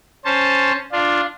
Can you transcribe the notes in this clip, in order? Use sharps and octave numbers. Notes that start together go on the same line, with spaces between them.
C#4 C5 A5
D4 F4